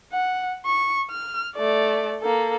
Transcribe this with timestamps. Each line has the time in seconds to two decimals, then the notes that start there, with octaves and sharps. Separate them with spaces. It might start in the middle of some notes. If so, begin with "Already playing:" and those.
0.12 F#5
0.66 C#6
1.10 F6
1.56 A3 D5
2.21 A#3 A4